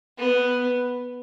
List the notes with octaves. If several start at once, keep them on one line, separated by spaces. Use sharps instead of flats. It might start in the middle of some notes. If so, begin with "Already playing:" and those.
B3